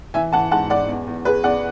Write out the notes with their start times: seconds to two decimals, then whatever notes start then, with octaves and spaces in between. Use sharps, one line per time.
0.14 E3 E5 G#5
0.32 E3 F#5 A5
0.51 G#2 F#5 A5
0.70 G#2 D5 F#5
0.88 E2
1.07 E2
1.25 E2 G#4 B4
1.44 E2 D5 F#5